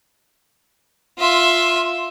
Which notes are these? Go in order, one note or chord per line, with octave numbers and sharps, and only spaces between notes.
F4 E5